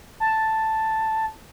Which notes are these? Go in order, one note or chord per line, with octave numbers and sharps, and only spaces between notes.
A5